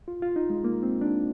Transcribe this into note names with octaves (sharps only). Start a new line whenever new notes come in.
F4
F4
D#4
G#3
A#3
C4
D4